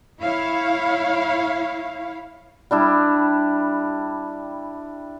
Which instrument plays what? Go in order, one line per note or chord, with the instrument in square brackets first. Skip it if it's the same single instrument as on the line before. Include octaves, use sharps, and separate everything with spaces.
[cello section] E4 C#5 F5
[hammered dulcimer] G3 D4 E4